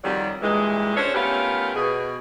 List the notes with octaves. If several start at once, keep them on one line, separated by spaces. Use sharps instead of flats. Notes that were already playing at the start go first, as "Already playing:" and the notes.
F2 D#3 F#3 G3
G2 A#2 E3 G#3
C#4 D4 A4 C5 C#5
A3 B3 C#4 F4 G4 A#4
B2 G#4